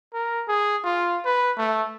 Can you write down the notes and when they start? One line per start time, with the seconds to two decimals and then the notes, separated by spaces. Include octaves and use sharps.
0.14 A#4
0.48 G#4
0.84 F4
1.26 B4
1.58 A3